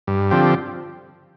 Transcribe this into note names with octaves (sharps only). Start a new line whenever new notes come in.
G2
D3 F3 C4 G4